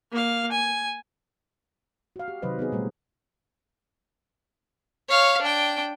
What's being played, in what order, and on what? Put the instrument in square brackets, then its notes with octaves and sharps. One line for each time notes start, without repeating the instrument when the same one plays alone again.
[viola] A#3 F5
G#5
[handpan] F#4 F5
G4
C3 D#3 F#3 B4 C5 D#5
B3 D#4 G#4
A#2 G3 A3 C5
[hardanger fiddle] C#5 F5
D4 G5